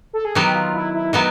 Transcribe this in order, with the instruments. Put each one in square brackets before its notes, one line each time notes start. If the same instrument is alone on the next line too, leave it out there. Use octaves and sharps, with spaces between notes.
[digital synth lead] A4
G#4
[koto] D#3 F#3 B3 [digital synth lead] G4
[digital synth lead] F4
E4
E4
[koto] D#3 F#3 B3 [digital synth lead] D#4